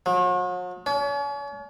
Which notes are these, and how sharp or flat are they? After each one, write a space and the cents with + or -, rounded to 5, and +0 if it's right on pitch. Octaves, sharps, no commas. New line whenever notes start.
F#3 -45
C#4 +40